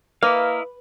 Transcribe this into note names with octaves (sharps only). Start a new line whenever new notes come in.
A#3 E4 B4 D#5 F5